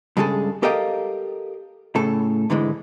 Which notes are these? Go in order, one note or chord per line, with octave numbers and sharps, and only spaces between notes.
G2 C#3 G#3 G#4 A4
G4 A4 A#4 D#5 F5 G5
A2 C#3 A4
G#2 D3 E3 G#3